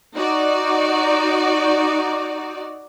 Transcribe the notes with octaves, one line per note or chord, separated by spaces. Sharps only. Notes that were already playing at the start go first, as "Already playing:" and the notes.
D#4 F#4 D5